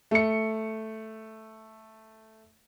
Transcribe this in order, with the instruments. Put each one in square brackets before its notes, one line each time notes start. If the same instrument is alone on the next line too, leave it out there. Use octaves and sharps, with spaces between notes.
[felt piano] A3 C#7